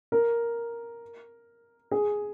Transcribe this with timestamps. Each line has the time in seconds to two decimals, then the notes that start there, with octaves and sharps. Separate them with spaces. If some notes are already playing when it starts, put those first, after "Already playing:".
0.12 A#4
1.91 G#4